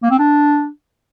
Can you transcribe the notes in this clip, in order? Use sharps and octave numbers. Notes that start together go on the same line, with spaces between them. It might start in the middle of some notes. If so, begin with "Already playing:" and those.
A#3
C4
D4